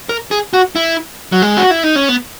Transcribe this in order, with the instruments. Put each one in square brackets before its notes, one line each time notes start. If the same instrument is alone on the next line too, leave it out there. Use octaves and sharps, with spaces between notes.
[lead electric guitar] A#4
G#4
F#4
E4
F#3
G#3
F#4
E4
D#4
C#4
B3